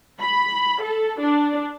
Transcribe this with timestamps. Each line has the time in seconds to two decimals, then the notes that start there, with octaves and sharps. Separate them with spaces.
0.21 B5
0.80 A4
1.20 D4